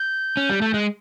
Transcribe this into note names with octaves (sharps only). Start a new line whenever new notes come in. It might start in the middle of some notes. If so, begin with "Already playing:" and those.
Already playing: G6
C#4
G3
A3
G#3